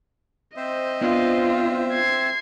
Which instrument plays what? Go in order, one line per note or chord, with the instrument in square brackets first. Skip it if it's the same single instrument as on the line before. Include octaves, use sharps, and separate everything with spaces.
[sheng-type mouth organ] C4 C5 E5 [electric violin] D#5
[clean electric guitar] B3 D4 [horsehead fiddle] F4
[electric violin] G#6 C7